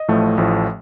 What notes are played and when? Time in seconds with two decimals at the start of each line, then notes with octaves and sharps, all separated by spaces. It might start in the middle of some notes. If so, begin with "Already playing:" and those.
Already playing: D#5
0.08 A1 A2 F3 A3
0.38 A1 A2 F3 A3